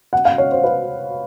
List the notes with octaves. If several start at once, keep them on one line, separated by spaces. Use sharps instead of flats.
F#5
F5
C#5
C5
B4